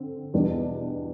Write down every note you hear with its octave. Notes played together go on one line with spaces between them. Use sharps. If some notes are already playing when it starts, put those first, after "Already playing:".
Already playing: D3 C4
E2 B2 G3 D4